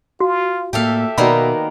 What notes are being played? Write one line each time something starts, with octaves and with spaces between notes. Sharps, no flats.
F4 F#4
A2 A#3 G4 A4 E5 F5
B2 D#3 A#3 B3 F#4 D5 B5